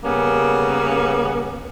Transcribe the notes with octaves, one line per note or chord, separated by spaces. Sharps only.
C#3 G3 A#3 B3 C#4